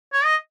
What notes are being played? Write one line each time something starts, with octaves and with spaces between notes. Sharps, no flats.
C#5
D#5